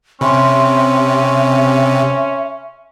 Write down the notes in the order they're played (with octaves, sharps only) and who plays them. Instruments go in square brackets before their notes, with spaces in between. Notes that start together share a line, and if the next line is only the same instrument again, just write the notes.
[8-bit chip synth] C3 [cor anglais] C#4 [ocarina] E5 [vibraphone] B5 C6